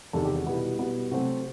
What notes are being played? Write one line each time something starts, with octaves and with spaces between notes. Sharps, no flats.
E2 C3 D#3 G3 A4
G4
F#4
B2 G3 B3 E4
B2 G3 B3
C3 F#3 A3 C4 F#4